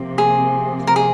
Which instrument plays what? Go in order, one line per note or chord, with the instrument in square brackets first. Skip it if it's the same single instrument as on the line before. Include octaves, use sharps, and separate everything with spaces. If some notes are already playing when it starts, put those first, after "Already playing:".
Already playing: [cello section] C3 F3 A#3
[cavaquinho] G#4
A#4
G#4